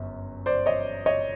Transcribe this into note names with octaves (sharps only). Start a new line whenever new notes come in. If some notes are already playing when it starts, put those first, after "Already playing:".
Already playing: G1 F#2
C5 D5
C#5 D#5
C#5 D#5